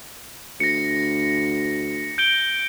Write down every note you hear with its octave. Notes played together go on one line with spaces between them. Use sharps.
D2 A#6 C#7
G6 D7 G7